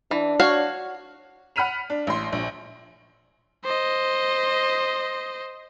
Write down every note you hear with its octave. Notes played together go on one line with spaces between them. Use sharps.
E3 D4
F#4 C#5 F5
F#5 B5 F6 B6 D#7 F7
D4
A1 C6
A#1
C5 D#5